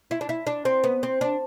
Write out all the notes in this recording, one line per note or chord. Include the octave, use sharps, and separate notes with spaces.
E4
D4
E4
D4
C4
B3
C4
D4